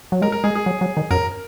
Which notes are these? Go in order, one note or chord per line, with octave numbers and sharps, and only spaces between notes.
F#3
G#3 A#4
A#4
G#3 G#4
G#4
F#3
F#3
D#3
F#2 A#4